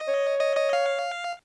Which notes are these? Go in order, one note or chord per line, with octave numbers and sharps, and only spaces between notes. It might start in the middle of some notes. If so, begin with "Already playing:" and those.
Already playing: D#5
C#5
D#5
D#5
F5